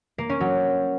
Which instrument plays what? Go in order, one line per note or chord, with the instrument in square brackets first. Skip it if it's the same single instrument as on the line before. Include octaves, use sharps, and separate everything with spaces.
[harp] A#3
C#4
F#3